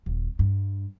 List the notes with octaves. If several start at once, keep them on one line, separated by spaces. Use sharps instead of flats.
D#1
G2